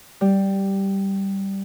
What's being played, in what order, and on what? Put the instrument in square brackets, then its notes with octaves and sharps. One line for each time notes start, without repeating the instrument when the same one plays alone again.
[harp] G3